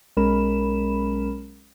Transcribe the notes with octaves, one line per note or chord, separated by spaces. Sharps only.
B1 G#3 C#4 A#4 B5 E7